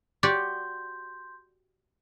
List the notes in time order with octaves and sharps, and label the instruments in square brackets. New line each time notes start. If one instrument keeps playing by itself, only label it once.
[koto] F#4 G4 D5 [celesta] C6 G6